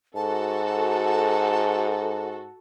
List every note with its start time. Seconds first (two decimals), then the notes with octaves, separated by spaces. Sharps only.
0.16 G#2 F#4 A4 A5